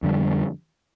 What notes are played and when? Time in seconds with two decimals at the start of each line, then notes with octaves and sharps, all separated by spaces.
0.03 F2 D3 G3